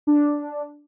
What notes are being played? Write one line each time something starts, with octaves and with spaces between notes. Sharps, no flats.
D4